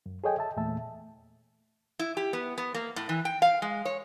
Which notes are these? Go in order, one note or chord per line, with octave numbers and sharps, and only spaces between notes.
F#2
G#4 A4 C#5 D#5 G5 G#5
E5 A5
E2 A#2 A3 E5 A5
E4
G4
B3
B3
A#3
A2
E3
G5
F5
G#3
C#5